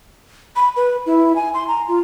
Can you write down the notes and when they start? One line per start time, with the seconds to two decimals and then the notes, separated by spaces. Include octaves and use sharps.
0.56 B5
0.76 B4
1.06 E4
1.36 G#5
1.54 C6
1.68 A#5
1.88 F4